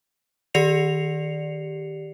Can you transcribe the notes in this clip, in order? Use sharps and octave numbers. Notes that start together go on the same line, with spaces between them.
D#3 G4 D5 C7 C#7 F7